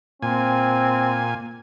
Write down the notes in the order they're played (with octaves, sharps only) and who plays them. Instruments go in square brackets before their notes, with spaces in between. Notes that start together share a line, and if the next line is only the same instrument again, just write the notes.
[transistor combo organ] A#2 G#5 [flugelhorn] C4